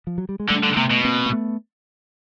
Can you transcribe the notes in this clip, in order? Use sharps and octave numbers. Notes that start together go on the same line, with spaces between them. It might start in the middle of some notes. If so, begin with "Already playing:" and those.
F3
F#3
G3
G#3
D3 G3 A3
D3
C3 A3 B3
B2
A#3 C4
A#3
A3 B3